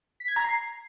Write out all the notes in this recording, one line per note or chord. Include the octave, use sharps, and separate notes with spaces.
B6
G#6
A#5
C7